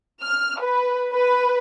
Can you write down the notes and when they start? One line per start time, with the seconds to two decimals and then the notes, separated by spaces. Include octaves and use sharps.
0.23 F6
0.61 B4
1.14 B4